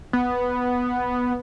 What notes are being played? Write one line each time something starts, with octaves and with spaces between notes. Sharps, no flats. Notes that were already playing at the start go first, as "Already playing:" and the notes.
B3